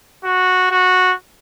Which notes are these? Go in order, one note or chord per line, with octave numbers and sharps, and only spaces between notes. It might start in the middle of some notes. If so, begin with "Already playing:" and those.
F#4
F#4